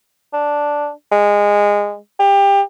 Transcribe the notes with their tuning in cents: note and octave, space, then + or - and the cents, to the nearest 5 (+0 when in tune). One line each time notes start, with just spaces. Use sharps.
D4 -5
G#3 -20
G4 +25